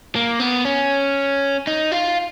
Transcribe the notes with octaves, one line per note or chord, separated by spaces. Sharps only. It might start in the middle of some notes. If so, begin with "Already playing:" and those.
A#3
B3
C#4
D#4
F4